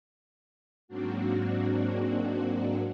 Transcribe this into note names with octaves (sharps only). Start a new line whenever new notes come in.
G#2 F#3 A#3 C4 D4 F#4